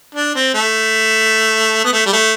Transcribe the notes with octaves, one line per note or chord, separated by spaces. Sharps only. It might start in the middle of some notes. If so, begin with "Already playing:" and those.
D4
C4
A3
B3
A3
G3
A3